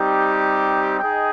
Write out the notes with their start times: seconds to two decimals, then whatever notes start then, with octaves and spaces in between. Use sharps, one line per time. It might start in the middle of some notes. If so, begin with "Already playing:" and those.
Already playing: G3 C4 D#4 G4
0.99 D#4 G#4 D#5 G5